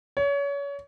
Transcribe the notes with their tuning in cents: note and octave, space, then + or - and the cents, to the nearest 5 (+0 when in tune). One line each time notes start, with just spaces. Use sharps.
C#5 +30